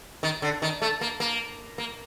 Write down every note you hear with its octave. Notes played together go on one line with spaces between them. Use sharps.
D#3
D3
D#3
A3
A#3
A#3
A#3